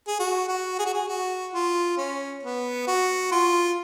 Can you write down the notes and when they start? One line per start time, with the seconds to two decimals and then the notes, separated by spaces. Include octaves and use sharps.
0.07 G#4
0.19 F#4
0.48 F#4
0.79 G#4
0.86 F#4
0.93 G#4
1.08 F#4
1.53 F4
1.98 C#4
2.43 B3
2.87 F#4
3.31 F4